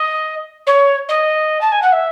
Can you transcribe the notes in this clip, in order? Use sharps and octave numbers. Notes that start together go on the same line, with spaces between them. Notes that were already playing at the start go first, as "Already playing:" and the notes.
Already playing: D#5
C#5
D#5
A5
G#5
F#5
E5